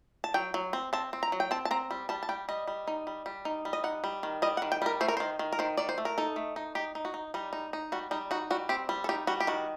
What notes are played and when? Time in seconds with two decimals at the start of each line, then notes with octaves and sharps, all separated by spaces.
0.24 A5
0.34 F#3 G5
0.54 F#3
0.73 C4
0.93 C4 A5
1.13 C4
1.23 A#5
1.32 F#3
1.40 G5
1.51 C4 A5
1.65 A5
1.71 C4 A#5
1.91 G3
2.09 G3 A5
2.23 A5
2.29 G3 G5
2.49 G3 D#5
2.67 G3
2.87 D#4
3.07 G3
3.26 G3
3.45 D#4
3.65 G3
3.73 D#5
3.84 D#4 F#5
4.04 G3
4.23 D#3
4.42 G3 D#5
4.57 F#5
4.62 D#3
4.72 G5
4.82 G3 A#4
5.01 A3 C5
5.08 A#4
5.17 D#3 C5
5.39 D#3
5.53 A#4
5.59 D#3 C5
5.77 D#3 D5
5.89 C5
5.98 A3
6.05 A#4
6.18 D#4 A4
6.36 A3
6.56 D#4
6.75 D#4 G4
6.95 D#4
7.05 F#4
7.14 D#4
7.34 G3 D#4
7.53 D#4
7.73 D#4
7.92 G3 F#4
8.11 G3 D#4
8.31 D#4 F#4
8.50 G3 F#4
8.69 C4 G4
8.89 G3
9.04 A4
9.09 D#4 G4
9.27 G3 F#4
9.40 G4
9.47 D#3 F#4